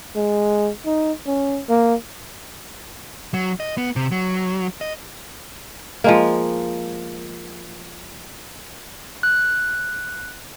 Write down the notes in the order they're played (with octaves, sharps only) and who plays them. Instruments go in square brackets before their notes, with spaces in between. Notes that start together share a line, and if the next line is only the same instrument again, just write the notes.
[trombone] G#3
D#4
C#4
A#3
[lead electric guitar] F#3
D#5
B3
C3
F#3
D#5
[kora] F3 G#3 A#3
[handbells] F#6